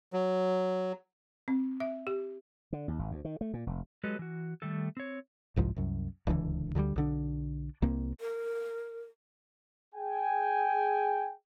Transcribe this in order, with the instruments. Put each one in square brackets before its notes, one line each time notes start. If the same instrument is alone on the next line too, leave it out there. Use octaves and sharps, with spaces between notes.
[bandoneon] F#3
[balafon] C4
E5
G4
[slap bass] D3
D#2
G#1
D2
D#3
A3
A#2
F1
[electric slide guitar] F#3 G#3 G4 A4 B4 D#5
E3 F#4
D#3 G3 A3 A4
C4 C#5
[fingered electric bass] G1 C2 G#2 F3
C2 F#2
D1 C#2 D3 E3
D2 D3 D#3 G3
B1 D3 D4
C2 A#3 C4
[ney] A#4
[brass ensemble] G#4 G5 G#5